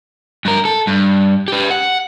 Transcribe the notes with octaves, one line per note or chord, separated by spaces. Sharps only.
G2 A#4
A4
G2
G4 B4
F#5